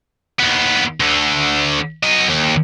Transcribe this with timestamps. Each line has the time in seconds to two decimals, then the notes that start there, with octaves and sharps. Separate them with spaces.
0.39 D#2 B3
1.00 D2 D3
2.03 F#3 D#5
2.28 D#2